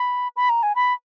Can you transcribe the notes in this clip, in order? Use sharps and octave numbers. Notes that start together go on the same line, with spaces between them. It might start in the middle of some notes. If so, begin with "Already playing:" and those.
Already playing: B5
B5
A#5
G#5
B5